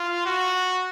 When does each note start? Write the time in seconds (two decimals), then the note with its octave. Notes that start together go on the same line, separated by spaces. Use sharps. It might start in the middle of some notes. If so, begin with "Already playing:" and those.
Already playing: F4
0.26 F#4